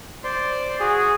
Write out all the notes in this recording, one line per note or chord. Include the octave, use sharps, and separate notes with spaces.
C5 D5 C6
F#4 G#4